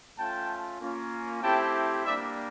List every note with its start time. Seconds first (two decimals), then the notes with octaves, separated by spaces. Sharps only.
0.18 A3 C#4 F4 G5 A5
0.81 A#3 C#4 F4
1.43 A3 C4 E4 G4 G5 A5
2.06 G3 A#3 D4 D5 E5